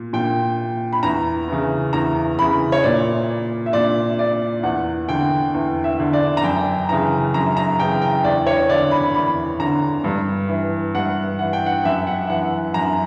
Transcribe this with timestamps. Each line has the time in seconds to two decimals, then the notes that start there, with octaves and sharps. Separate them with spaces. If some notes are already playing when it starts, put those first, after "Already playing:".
Already playing: A#2
0.13 A#2 G5
0.93 B5
1.03 E2 A#5
1.48 C#3 E3
1.93 E2 A#5
2.39 C#3 E3 B5
2.72 C#5
2.84 A#2 D5
3.66 E5
3.73 A#2 D5
4.19 D5
4.63 E2 F#5
5.09 D3 G5
5.54 E2
5.84 E5
6.00 D3
6.13 D5
6.37 A#5
6.43 F#2 G5
6.89 C#3 E3 A#5
7.34 F#2 A#5
7.57 A#5
7.79 C#3 E3 G5
8.02 G5
8.24 E2 D5
8.47 C#5
8.69 D3 D5
8.91 B5
9.14 E2 B5
9.59 D3 A#5
10.04 G2
10.49 E3
10.95 G2 F#5
11.39 E3 F#5
11.53 G5
11.66 F#5
11.84 F#2 E5
12.07 F#5
12.29 E3 F#5
12.74 F#2 A#5